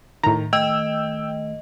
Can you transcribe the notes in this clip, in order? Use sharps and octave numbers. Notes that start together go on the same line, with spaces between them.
A2 D#3 A#5
D#3 A3 D#5 G5 E6